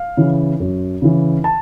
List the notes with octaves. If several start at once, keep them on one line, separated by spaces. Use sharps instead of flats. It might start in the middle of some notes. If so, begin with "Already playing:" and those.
Already playing: F5
C#3 E3
F#2
C#3 E3
A5